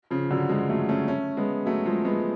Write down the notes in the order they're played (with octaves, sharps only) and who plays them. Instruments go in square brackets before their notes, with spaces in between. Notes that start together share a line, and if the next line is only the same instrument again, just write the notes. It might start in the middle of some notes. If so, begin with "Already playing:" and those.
[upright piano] C#3 F3
D3 F#3
F3 G#3
F#3 A3
A3 C#4
A3 C#4
G#3 B3
F#3 A3
F3 G#3
G#3 B3